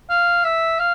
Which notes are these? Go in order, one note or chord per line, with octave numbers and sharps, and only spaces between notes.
F5
E5
F5